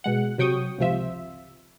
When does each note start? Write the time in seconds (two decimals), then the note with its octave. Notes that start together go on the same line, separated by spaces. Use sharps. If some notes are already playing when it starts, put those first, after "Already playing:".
0.04 B2 G#3 F#5
0.38 C3 F#3 G5 C#6 D#6
0.78 G#1 C#2 C3 F3 F4 E5